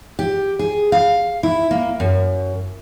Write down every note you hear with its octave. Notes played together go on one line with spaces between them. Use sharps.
G4
G#4
F5
E4
A#3
F#2